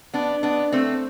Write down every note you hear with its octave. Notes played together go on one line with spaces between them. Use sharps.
B3 D4
B3 D4
A3 C4